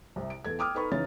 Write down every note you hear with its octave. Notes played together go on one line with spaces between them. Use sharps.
C2 C3
D7
E2 A4 G#6
G5 D6 D#6 F6
D#4 A4 B4 B5 C#6
C#3 E3 D#4 C#5 A6